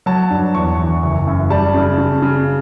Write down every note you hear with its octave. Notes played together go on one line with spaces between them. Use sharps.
F#3 A5
G2
E2 C#6
E3
F#1
F#2
G3 A5
C#3
C#3
C#3